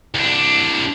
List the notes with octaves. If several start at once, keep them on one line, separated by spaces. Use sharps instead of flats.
C2 D4